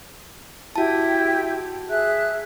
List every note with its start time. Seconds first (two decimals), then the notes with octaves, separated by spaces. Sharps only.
0.76 E4 F#4 G4 G5 A5
1.88 G#4 E5 F#6